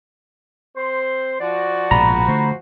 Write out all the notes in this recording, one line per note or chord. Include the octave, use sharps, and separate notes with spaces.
C4 C5 C6
F3 F#4 D5
A#1 G#2 B2 A#5 B5
D3 A3 C5